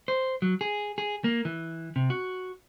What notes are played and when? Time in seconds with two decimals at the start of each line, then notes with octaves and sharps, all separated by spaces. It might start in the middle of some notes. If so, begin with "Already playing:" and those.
0.08 C5
0.42 F#3
0.61 G#4
0.98 G#4
1.24 A#3
1.45 E3
1.96 C3
2.10 F#4